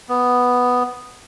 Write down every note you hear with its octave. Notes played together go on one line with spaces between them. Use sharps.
B3